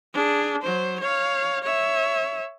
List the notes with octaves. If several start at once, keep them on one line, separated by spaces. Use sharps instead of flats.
D4 G#4
F#3 C5
C#5 F5
C#5 E5